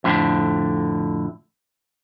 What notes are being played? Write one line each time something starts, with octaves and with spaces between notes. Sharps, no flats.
F2 A2 D3